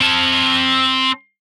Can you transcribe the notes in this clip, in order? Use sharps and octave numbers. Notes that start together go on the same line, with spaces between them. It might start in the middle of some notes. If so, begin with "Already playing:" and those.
C4 A5